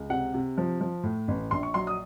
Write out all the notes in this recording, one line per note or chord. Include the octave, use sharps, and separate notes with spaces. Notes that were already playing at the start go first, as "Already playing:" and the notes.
Already playing: C#2
C3 F#5
C3
F3
F3
A2
A1
A#1 C6
C#6
F#3 C6
D#6